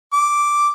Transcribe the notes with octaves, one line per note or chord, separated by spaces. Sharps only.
D6